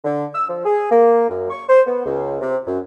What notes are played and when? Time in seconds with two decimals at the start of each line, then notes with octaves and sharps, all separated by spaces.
0.04 D3
0.34 E6
0.49 F3
0.65 G#4
0.91 A#3
1.29 F#2
1.50 C#6
1.69 C5
1.86 B3
2.05 C#2
2.41 C3
2.66 F#2